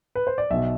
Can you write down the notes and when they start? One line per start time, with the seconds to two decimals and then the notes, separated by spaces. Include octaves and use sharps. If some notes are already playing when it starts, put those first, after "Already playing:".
0.15 B4
0.27 C5
0.38 D5
0.50 B1 B2 E5